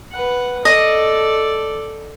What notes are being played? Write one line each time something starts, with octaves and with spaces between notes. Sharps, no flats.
B4 F#5
A4 D5 D#5